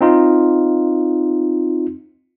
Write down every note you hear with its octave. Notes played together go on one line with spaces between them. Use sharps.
C4 D#4 F4